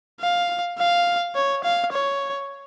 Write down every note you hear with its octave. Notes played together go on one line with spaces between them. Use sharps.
F5
F5
C#5
F5
C#5